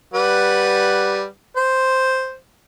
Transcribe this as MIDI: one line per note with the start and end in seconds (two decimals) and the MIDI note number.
0.14 1.25 55
0.14 1.25 71
0.14 1.25 78
1.57 2.35 72